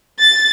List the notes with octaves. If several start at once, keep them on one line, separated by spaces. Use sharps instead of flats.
A6